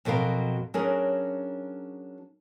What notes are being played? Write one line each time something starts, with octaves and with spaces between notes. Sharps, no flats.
F2 B2 F#3 A#4 F5
F#3 C#4 D4 G#4 A#4